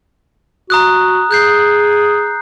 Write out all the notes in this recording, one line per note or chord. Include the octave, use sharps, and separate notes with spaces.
F#4 A#5 D#6 F#6
G#4 F#6 G6 C7